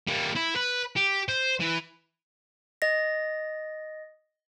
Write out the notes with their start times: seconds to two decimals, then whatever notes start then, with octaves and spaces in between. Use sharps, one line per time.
0.08 G3 A#3
0.36 E4
0.56 B4
0.97 G4
1.29 C5
1.60 E3
2.82 D#5 A#6